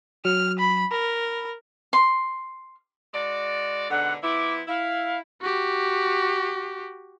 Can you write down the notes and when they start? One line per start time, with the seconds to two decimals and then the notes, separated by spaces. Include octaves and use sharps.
0.25 F#3 F6
0.59 B5
0.91 A#4 B5
1.93 C6
3.14 G#3 F#4 D5
3.90 G#2 B2 D3 F#5
4.23 F3 B3 E4 D6
4.68 E4 F5
5.42 F#4 G4